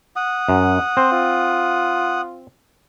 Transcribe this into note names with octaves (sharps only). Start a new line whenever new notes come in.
F#5 D#6
F#2
C4 C5
F4